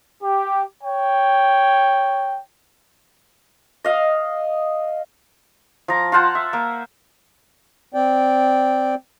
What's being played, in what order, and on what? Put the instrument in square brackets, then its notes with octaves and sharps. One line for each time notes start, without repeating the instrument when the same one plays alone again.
[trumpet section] G4
C#5 G5
[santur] D#5 F5
F3 A#5
F4 C5 F#5 A5
E5
A#3
[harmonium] C4 D5 G5